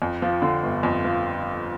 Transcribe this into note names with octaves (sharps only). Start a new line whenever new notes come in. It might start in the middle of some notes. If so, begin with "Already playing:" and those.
F2
F3
D3
G1
F2
F3